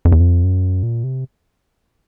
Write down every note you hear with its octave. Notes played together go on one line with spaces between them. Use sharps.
F2
E2
F2
F#2
A#2
C3